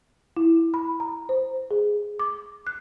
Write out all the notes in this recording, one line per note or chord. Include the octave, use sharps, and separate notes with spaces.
E4
B5
A#5
C5
G#4
D6
F#6